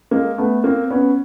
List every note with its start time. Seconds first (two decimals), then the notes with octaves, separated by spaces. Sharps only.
0.11 G#3 A#3
0.38 A3 B3
0.64 A#3 C4
0.91 B3 C#4